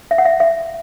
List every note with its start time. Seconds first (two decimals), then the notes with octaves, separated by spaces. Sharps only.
0.11 E5
0.18 F#5
0.25 E5
0.40 E5